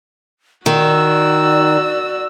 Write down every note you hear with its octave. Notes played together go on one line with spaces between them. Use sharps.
D#3 F#4 D5 E6